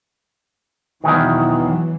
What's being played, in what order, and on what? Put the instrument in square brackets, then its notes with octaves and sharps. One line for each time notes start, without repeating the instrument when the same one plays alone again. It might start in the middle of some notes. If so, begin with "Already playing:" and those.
[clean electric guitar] E2 G#2 D#3 [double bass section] B2 E3 F#3